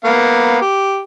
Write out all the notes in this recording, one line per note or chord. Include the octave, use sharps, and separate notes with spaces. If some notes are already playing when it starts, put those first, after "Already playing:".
A#3 B3 F5
G4